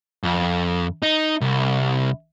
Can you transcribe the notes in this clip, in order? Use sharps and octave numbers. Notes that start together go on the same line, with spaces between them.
F2
D#4
C2